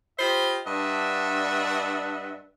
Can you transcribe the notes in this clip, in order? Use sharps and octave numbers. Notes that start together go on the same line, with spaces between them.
F4 G4 C5 D#5 B5
G2 D4 D#5 E5 F#5